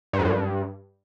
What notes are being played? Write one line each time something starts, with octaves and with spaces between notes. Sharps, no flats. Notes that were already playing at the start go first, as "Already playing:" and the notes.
G2
F2
F#2
G2